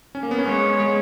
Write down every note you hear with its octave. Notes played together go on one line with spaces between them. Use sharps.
C#4
A#3
B3
C#4
G#3 C#5
G#3